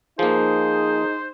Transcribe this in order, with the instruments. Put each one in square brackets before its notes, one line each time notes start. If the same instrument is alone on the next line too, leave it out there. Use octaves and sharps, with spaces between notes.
[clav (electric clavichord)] F3 A#3 [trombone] D#4 [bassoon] G#4 [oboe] C5